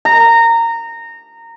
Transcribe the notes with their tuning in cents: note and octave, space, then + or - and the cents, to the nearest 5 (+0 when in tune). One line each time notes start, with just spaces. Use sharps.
A#5 -20